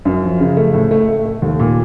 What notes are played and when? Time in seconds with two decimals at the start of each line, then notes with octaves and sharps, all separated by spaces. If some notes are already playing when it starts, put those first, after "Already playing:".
0.05 F#2
0.22 F3
0.40 C#3
0.57 A3
0.74 A2
0.91 A3
1.08 A3
1.25 A3
1.42 D#2
1.60 A#2